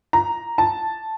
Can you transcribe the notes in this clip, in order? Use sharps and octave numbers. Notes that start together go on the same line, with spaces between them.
A#5
A5